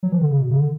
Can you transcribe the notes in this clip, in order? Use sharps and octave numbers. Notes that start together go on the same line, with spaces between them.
F#3
E3
D3
C#3
B2
C#3
D3